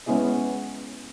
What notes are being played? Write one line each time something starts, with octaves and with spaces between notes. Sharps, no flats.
G#3 B3 C#4 E4 G#4 D#5